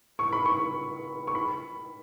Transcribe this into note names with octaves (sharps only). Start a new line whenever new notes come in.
C#6
B5
C#6
C#6
B5